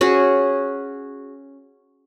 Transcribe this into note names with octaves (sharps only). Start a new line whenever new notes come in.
C#4 F#4 G#4